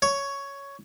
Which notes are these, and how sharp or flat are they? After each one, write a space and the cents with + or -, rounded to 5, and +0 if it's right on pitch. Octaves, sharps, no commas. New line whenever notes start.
C#5 +10